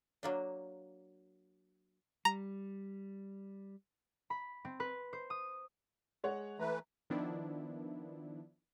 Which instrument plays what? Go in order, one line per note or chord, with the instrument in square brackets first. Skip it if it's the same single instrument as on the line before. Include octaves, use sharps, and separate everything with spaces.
[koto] F#3 A#3 D4
[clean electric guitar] G3 [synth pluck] A#5
[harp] B5
C4
B4
C5
D#6
[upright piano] G#3 C#5 F#5
[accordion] E3 A3 B4 [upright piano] A#5
[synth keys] D#3 F3 B3 D4 E4